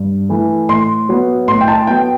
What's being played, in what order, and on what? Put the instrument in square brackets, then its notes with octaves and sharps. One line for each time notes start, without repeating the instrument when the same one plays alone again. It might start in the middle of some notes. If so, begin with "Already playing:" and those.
Already playing: [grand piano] G2
E3 A3
A2 C6
F#3 B3
A2 C6
G5
A5
B3 G5
F#3